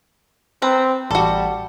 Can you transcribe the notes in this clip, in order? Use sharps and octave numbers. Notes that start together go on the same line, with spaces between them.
C4 B4 A#5
A1 G3 F#4 A4 A5